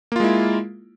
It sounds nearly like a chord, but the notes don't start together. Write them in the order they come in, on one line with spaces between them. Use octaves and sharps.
A#3 F4 G#3 E4